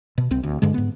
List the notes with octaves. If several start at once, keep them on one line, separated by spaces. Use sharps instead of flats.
B2
C2 C4
D2
G2 D3 G#3
G#2 B3